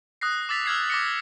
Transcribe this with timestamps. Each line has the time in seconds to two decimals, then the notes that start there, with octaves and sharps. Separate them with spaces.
0.21 D#6 F#6 A#6 C7
0.49 D6 E6 A6 B6 F7
0.66 E6 F6 G#6 C7
0.90 D6 A#6 C#7